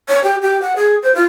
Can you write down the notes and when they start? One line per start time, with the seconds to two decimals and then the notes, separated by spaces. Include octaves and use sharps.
0.08 C#5
0.24 G4
0.42 G4
0.62 F#5
0.76 G#4
1.03 C5
1.15 F4